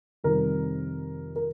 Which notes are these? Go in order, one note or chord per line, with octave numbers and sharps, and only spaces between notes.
F2 C3 D#3 G3 A#4
A#4